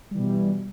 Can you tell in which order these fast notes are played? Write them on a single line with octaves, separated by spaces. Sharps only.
G3 E3 B2